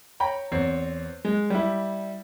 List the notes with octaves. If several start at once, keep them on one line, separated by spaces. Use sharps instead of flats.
C#5 G5 A#5 B5
E2 C4 C#5 C7
G#3
G3 E4